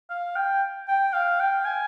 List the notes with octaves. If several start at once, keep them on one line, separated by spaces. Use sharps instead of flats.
F5
G5
G5
F5
G5
G#5